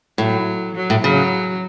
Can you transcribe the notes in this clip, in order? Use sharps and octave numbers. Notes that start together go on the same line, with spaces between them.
A2 F#3
F#3
A2
C#3 F#3